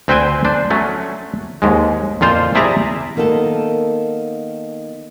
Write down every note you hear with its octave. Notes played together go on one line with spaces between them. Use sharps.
D2 C4 B4 C5 G5 G#5
D4 C5
F#3 A3 C#4
D#2 G#2 G#3
F2 A#2 F4 C5
C3 E4 G#4 D5 E5 A#5
D#3 A#3 B3 A4